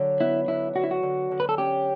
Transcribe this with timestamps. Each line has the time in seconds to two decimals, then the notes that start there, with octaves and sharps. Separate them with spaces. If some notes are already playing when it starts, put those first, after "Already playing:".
Already playing: D3 F#3
0.21 B3 E4
0.48 D3 E4
0.75 D3 F#4
0.84 E4
0.91 F#4
1.03 D3
1.31 D3
1.40 B4
1.49 A4
1.58 C#4 G4